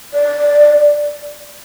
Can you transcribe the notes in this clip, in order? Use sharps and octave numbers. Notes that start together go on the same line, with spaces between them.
D5